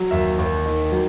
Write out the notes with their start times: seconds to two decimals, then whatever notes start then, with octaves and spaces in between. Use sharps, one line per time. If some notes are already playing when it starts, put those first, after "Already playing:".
Already playing: F#3
0.11 D#2 E5
0.39 D#2
0.66 D#3
0.92 F#3